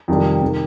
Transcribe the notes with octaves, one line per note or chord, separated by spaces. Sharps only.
F2 C3 D#3 G3
C3 D#3